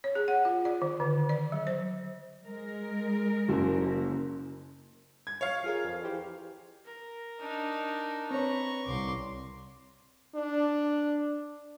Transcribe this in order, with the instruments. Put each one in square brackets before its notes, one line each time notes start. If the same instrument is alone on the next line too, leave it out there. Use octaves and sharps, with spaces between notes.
[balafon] C#5
G#4
F#5
F4
D5
D#3
D3
D5
F#3
C5
[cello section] G#3 A#4
[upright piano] F#1 F#2 A#3
[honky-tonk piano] G#6
C#5 F5
[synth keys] F4 G#4 A#4
F2
E3 G4 C5
[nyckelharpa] A#4
[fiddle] D4 D#4
[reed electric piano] C4 C#5 [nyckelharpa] B4 A#5 [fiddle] C#6
[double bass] C2 [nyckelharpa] C6 D6
[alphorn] D4